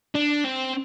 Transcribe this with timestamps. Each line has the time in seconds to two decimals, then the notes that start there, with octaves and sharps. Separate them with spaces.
0.15 D4
0.45 C4